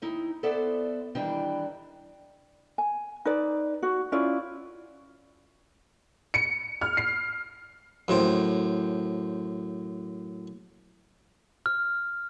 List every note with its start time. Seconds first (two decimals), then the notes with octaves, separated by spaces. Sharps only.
0.02 D#2 D#4 E4
0.43 B3 A4 C5 D5 E5
1.15 D#3 E3 G3 D4 E4 G5
2.78 G#5
3.25 D#4 B4 D5
3.83 F#4
4.12 C#4 E4 F4 D5
6.34 C#7
6.81 F6
6.97 C7
8.08 F#2 A2 C5 G5
11.66 F6